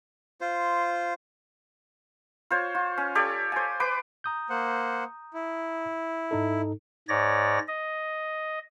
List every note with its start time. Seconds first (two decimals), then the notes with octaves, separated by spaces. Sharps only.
0.41 F4 C5
2.50 F4 C5 C#5
2.75 F4
2.97 C#4
3.15 G4 A4 C#5 D5
3.52 C5 G#5
3.80 B4 C6 D6
4.24 A#5 D#6 G6
4.50 A#3 C5 F#5
5.34 E4
6.31 G#2 D#4 A4
7.09 G#2 C#5 D5 A#6
7.68 D#5